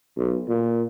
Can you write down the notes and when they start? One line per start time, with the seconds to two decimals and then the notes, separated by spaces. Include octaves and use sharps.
0.17 B1
0.48 A#2